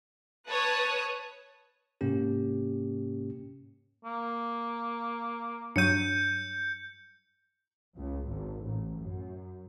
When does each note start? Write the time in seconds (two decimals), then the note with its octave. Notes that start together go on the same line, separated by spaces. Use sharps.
0.47 B4 C#5 A5 D#6 F#6
2.01 G#2 C3 A#3 C#4 G4
4.05 A#3
5.76 G2 F#3 G6 C#7 D#7
7.97 C#2
8.28 G#1
8.62 A1
8.99 F#2